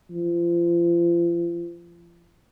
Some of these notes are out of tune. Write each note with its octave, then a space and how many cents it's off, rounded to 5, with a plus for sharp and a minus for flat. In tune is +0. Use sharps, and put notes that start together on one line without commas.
F3 -35